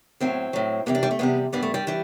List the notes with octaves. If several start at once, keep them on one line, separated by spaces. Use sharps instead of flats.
A2 F#3 C4
A2 F#3
E2 C3 G3 B3
D4
G3
A3
E2 C3 G3 B3
G2 E3 G3 B3
A3
G3
E3 G3